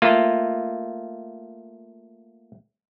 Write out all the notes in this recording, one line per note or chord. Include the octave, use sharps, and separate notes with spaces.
A3 A#3 F4